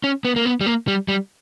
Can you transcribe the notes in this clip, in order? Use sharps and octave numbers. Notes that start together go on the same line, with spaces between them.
C#4
B3
A#3
B3
G3
A#3
G3
G3